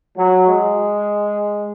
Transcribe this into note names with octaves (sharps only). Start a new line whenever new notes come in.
F#3
G#3